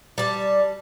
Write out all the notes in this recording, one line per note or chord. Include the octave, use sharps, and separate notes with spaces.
G3 A5